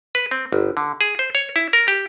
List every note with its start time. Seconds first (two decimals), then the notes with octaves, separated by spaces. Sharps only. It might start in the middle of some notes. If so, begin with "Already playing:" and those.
0.15 B4
0.31 C4
0.52 G1
0.77 D3
1.01 G#4
1.19 C5
1.35 C#5
1.56 E4
1.73 A#4
1.88 G4